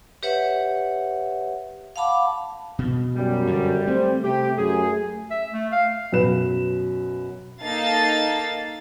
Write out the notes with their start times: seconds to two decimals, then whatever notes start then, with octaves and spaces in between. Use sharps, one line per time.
0.23 G4 B4 C#5 E5 F#5
1.96 F5 F#5 A5 B5 D6
2.79 B2
3.16 F#2 G3
3.47 G2 D3
3.87 A3 C4
4.23 C3 G4
4.58 F#2 G#4
5.31 E5
5.53 A3
5.72 F5
6.12 F#2 B2 B4 E7
7.62 A#3 D#4 A4 F5 A6